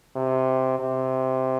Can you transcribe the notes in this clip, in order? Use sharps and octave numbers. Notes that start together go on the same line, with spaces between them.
C3
C3